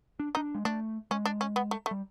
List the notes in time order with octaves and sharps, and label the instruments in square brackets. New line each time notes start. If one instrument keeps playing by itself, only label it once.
[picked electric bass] D4
[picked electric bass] D4 [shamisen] D#4
[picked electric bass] G#3
[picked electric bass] A3 [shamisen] D4
[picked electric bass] G#3 [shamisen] C#4
[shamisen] D4
C#4
B3
A3
A3
[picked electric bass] G3